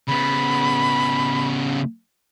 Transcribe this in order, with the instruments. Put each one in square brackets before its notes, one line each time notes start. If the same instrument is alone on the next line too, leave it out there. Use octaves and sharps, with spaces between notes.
[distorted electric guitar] C#3 B3 [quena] B5